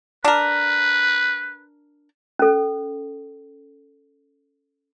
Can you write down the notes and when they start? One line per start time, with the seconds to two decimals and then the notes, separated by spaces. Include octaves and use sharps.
0.25 D4 A#4 B4
2.39 C#4 A4